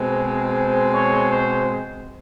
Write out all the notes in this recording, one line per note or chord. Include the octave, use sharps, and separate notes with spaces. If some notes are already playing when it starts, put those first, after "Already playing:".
Already playing: B2 G#3 C4
C5
C#5
C5